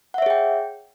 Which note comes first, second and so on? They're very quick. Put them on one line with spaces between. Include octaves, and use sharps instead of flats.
F#5 E5 C#5 G#4 G5